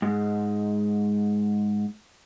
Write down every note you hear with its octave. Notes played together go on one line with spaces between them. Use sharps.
G#2 G#3